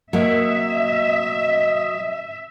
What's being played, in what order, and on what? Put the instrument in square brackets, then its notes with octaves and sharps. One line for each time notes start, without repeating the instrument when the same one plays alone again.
[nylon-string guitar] F#3 A#3 [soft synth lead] D#5 [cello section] E5